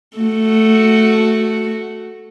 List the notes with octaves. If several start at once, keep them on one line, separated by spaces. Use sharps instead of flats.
A3 F#4